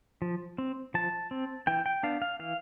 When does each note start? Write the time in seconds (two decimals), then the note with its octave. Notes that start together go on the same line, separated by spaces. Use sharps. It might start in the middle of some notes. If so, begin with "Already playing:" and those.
0.22 F3
0.58 C4
0.94 F3 A5
1.31 C4
1.67 E3 G5
1.86 G5
2.03 B3 D4 F5
2.22 F5
2.39 E3 F5